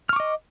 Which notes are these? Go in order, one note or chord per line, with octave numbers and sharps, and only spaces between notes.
D#5 C#6 D6 F6